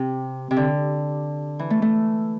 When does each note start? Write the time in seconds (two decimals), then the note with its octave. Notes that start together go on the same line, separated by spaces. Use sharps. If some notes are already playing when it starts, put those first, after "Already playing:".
Already playing: C3
0.51 C3
0.57 D3
1.59 E3
1.70 A3
1.82 A3